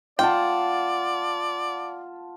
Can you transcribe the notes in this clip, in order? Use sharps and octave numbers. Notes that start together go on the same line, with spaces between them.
F4 D5 F#5 G5 A5